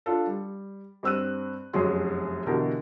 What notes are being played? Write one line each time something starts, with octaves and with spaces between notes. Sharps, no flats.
D4 F4 A4
G3
G2 C4 E6 F#6 D#7
F1 F#2 F#3 F#4 G#4 C6
B2 D3 E3 G4 A#4